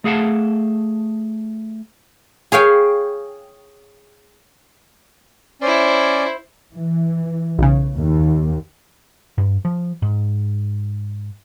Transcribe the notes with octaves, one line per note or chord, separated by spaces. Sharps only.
A3 G#4 F5 F#5 A5
G#4 C#5 F5 G5
C#4 E4 C5 D5
E3
B1 C#3
D#2
G2
F3
G#2